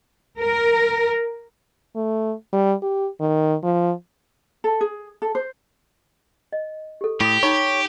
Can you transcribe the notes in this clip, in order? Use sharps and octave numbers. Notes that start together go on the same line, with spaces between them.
A#4
A3
G3
G4
D#3
F3
A4
G#4
A4
C5
D#5
G4 A4
A2 G4 D6 D#6
D#4 C#5 A#5 B5